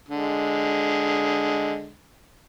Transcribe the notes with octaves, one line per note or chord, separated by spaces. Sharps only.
D3 G#3